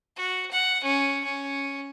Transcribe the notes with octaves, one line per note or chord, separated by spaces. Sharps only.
F#4
F#5
C#4
C#4